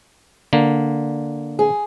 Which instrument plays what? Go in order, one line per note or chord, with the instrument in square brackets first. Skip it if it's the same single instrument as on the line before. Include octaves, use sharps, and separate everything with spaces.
[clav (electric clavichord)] D3 A#3
[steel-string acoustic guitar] G#4